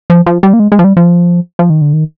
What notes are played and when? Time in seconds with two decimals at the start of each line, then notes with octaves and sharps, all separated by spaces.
0.10 F3
0.26 F3
0.43 G3
0.53 A#3
0.59 G#3
0.72 G#3
0.79 F3
0.84 G3
0.97 F3
1.59 F3
1.70 D#3
1.81 D3
1.93 D#3